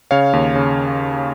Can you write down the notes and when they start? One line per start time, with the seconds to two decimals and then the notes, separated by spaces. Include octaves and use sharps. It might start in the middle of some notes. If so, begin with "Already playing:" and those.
0.11 C#3 C#5 F5
0.33 D#2
0.56 C#3